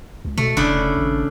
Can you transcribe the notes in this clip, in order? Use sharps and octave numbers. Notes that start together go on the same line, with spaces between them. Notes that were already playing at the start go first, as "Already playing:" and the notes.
C#2
B2 A3
F1 C#3 D4 E4
G#1